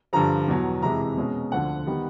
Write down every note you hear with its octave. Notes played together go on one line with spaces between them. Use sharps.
G2 D3 F3 A#5
E2 B2 F#3
F2 C3 E3 G#3 A#5
B2 G#3 C#4
D2 D3 F3 F#5
D#3 G3 B3